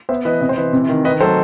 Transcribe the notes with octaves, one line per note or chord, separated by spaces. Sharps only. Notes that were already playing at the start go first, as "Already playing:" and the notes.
B3 C5 E5
E3 B4 D#5
C3 D#5
C5
E3 B4 D#5
C3
D#3
D#3 B4 D#5
F#3 A4 C5